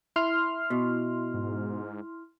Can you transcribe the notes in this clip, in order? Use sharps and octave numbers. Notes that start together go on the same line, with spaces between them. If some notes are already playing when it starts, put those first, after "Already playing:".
E4 C6 F6
B2
G#2